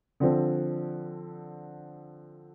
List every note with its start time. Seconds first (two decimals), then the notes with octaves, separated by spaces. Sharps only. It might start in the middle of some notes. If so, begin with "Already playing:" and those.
0.20 D3 F3 C4